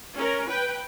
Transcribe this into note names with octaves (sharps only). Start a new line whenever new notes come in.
C#4 A#4
B4 G5